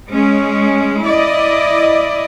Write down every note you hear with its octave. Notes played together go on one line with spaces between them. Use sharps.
G#3 C#4
E4 D5 D#5